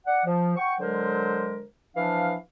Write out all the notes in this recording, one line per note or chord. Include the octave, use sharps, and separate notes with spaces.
D5 F#5
F3
F#5 G5 C#6
D3 F#3 G#3 A#4 C5
E3 F3 D4 F5